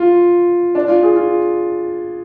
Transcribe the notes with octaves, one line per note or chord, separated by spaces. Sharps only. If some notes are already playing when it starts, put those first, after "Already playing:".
Already playing: F4
D4
F4
G#4
F4